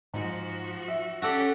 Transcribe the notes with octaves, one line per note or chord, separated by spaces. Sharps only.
G#2 F3 F#4
E5
C#4 F#4 G4 A4 D5